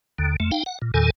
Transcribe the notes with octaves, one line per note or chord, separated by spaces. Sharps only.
D#2 D3
F2 A3
D#4 F5 G5
F#5
A#2
E2 A#2 D#3 A4 G#5